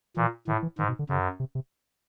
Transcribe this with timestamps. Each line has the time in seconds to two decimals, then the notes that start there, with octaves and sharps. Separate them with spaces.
0.17 A#2 E3
0.48 A2 D#3
0.63 E3
0.78 G#2 D#3
0.88 B2
0.99 D3
1.09 F#2 C#3
1.40 C3
1.55 C3